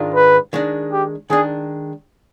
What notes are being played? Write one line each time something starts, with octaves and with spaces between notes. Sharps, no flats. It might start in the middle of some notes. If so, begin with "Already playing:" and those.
Already playing: G#2 D#3 G#3 D4 F4
B4
D#3 G#3 D4
G4
D#3 G#3 D4 G#4